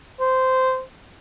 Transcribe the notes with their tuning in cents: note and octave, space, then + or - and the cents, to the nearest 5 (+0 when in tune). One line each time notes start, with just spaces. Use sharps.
C5 -15